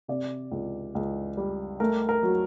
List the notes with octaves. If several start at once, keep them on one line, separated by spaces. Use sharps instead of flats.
C3 D5
C#2
C#2
G3
A3 A#4
A#4
F#3